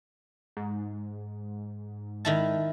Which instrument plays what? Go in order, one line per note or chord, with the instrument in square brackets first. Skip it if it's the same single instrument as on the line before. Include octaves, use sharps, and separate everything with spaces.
[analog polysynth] G#2
[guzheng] D#3 E4 A5